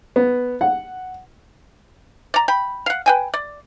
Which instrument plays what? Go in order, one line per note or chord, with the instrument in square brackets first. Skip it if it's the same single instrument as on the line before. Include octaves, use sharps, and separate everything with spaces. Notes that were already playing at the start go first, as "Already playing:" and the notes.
[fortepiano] B3
F#5
[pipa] D5 A#5
G5 B5
F5 F#5
B4 G5 G#5
D5